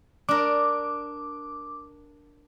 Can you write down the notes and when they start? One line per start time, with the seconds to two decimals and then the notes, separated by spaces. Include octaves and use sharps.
0.29 D4 A#4 D6